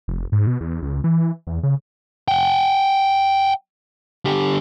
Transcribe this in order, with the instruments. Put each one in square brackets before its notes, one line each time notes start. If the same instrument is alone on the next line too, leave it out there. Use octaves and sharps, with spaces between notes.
[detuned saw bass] F1
G#2
B2
E2
C#2
E3
E2
C#3
[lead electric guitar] F#5 G5
D3 G4